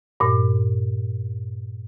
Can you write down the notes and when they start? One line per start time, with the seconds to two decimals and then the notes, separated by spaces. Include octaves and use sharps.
0.20 G2 A#2